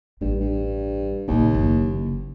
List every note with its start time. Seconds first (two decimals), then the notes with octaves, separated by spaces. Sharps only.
0.21 A1 G2
0.40 G2
1.28 A#1 D#2 C#3
1.55 F#1 E3